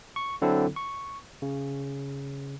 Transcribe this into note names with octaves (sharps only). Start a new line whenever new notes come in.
C#6
D3 F#3 C4 E4 A4
C#6
C#3